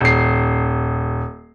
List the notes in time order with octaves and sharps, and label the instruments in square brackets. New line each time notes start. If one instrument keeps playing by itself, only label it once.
[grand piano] D#1 C7